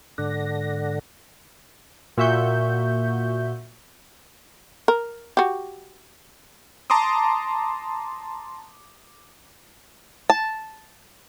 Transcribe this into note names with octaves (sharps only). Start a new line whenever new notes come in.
G#2 D3 A4 D5 F#5 A#6
A#2 F#4 E5 C#6 G6
A#4
F#4 G4
A5 A#5 C6 D6 D#6
A5